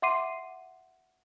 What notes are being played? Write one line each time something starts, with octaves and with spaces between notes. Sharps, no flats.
E5 F#5 C6 D6 C7 D#7